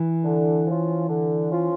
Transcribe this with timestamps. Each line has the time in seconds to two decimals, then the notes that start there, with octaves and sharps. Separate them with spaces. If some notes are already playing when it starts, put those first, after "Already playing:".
Already playing: E3
0.24 D3
0.66 F3 C#4 F4
1.08 D3
1.51 F3 C#4 F4